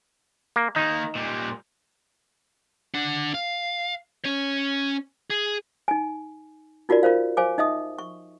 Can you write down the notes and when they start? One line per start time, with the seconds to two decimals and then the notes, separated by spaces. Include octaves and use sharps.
0.56 A#3
0.76 D#3 A#3 D#4
1.15 A#2 G3
2.94 D4 F#5
3.34 F5
4.24 C#4 C#5
5.30 G#4
5.88 D#4 G#5
6.89 D#4 F4 F#4 A#4 D5
7.03 F4 A#4 C5 F5
7.37 C5 F5 G#5 D6
7.58 D#4 D#5 E5 D#6
7.99 C#6